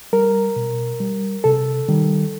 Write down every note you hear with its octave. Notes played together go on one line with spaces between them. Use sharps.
G3 A#4
B2
G3
C3 A4
D#3 G3